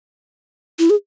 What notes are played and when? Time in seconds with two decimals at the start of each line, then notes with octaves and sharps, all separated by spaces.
0.79 E4
0.90 G#4